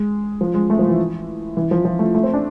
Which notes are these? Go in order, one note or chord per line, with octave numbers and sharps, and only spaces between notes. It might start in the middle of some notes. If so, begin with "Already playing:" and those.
Already playing: G#3
F3
G#3
A3
F3
E3
E3
F3
F3
A3
A3
C4
D4